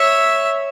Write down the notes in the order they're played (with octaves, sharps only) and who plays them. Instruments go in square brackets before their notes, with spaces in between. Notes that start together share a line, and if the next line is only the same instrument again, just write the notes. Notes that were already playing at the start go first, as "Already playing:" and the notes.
Already playing: [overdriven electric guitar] C#5 [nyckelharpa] E5